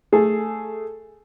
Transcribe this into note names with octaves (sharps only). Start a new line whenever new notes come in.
A3 G#4 A4